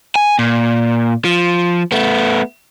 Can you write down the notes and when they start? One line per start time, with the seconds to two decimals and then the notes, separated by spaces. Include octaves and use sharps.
0.16 G#5
0.39 A#2
1.25 F3
1.92 A3 B3